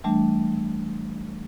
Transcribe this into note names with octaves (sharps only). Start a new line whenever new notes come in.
E3 G3 A3 D4